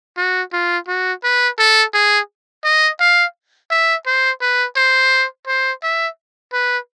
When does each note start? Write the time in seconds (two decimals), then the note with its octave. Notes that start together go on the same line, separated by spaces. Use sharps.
0.17 F#4
0.53 F4
0.88 F#4
1.24 B4
1.59 A4
1.94 G#4
2.65 D#5
3.00 F5
3.70 E5
4.06 C5
4.41 B4
4.76 C5
5.47 C5
5.83 E5
6.53 B4